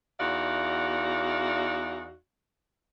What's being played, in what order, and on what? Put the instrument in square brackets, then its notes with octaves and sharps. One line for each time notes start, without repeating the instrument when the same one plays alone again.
[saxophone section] E2 D#4 F#4 D5 E5 F5